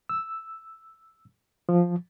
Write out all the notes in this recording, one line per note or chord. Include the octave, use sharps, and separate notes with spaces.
E6
F3